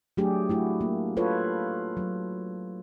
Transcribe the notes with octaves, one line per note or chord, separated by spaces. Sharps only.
F#3 A3 D4 G4 G#4
A3 E4 F#4
A#3
F4 A4 B4 C#5
F#3